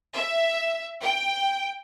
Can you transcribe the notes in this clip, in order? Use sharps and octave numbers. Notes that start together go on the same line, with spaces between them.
E5
G5